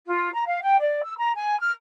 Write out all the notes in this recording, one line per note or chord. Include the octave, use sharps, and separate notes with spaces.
F4
A#5
F5
G5
D5
E6
A#5
G#5
F6